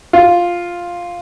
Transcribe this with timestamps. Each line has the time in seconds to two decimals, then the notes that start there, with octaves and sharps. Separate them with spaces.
0.13 F4